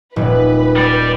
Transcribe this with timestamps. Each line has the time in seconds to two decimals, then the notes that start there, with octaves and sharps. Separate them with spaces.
0.16 D#1 B4
0.76 G3 D5